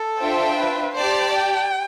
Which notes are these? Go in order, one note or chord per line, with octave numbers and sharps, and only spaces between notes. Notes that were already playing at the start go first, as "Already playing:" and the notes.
Already playing: A4
D4 F4 C5 E5 G5
B4
G4 C5 D5 A5
G5